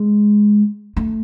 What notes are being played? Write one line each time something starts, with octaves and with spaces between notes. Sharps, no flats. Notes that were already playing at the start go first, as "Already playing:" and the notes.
Already playing: G#3
A3